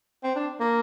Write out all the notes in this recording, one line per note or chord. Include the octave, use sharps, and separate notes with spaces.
C4
D4
A#3